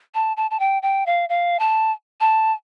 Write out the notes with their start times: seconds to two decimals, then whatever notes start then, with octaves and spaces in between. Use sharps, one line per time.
0.14 A5
0.37 A5
0.51 A5
0.60 G5
0.82 G5
1.06 F5
1.29 F5
1.59 A5
2.21 A5